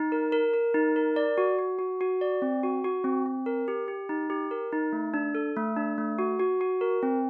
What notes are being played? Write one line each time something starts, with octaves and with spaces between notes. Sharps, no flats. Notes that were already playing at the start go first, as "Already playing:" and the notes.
Already playing: D#4
A#4
A#4
A#4
D#4
A#4
D5
F#4
F#4
F#4
F#4
D5
C4
F#4
F#4
C4
C4
A#4
G4
G4
D#4
G4
A#4
D#4
A3
D4
A4
A3
D4
A3
F#4
F#4
F#4
A#4
C4